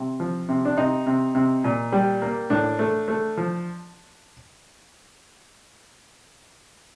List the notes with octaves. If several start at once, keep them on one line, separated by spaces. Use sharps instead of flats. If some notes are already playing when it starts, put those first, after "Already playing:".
Already playing: C3
F3
C3
D4
C3 D#4
C3
C3
A#2
G3
A#3
A2 D4
A3
A3
F3